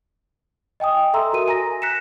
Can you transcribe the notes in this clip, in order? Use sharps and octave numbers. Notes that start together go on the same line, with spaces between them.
D#5 G5 G#5 D#6
A4 E5 A#5 C6 D#6 E6
F#4 A#4 D#7
G#5 A#5 A#6
F#6 A#6 B6 C#7 E7